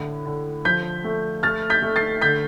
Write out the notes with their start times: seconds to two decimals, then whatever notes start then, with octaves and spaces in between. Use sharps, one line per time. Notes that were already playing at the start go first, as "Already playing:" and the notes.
Already playing: A2 D3
0.26 D3
0.65 F3 G6 B6
1.04 A3
1.43 A3 F6 A6
1.70 G6 B6
1.82 A3
1.96 A6 C7
2.22 D3 G6 B6